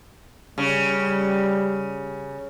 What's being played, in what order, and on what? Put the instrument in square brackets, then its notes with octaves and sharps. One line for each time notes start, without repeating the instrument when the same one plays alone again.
[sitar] C#3 [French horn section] G3